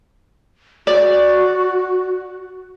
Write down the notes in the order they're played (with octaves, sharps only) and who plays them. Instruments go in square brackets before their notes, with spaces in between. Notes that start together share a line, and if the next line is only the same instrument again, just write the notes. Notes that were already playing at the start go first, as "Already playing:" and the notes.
[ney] F#4 [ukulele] D5